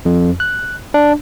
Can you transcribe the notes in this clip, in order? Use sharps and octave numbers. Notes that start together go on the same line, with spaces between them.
F2
F#6
D4